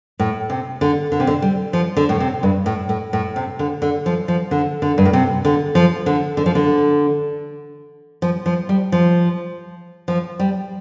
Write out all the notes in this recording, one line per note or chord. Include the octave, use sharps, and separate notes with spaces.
A2
C3
D3
D3
C3
D3
G3
F3
D3
A2
C3
G2
A2
A2
A2
C3
D3
D3
F3
F3
D3
D3
G2
A2
C3
D3
F3
D3
D3
F3
D3
F3
F3
G3
F3
F3
G3